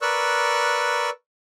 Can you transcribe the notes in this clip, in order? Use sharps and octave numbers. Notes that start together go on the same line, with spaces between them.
A#4 B4 D5 C#6 E6 F#6